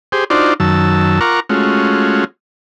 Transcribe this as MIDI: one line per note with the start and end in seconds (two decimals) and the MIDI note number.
0.12 0.24 67
0.12 0.24 68
0.12 0.24 72
0.30 0.54 62
0.30 0.54 63
0.30 0.54 65
0.30 0.54 66
0.30 0.54 72
0.30 0.54 74
0.60 1.20 42
0.60 1.20 51
0.60 1.20 54
0.60 1.20 81
0.60 1.20 88
1.21 1.40 65
1.21 1.40 70
1.21 1.40 78
1.21 1.40 82
1.21 1.40 85
1.21 1.40 86
1.49 2.25 56
1.49 2.25 57
1.49 2.25 61
1.49 2.25 65
1.49 2.25 66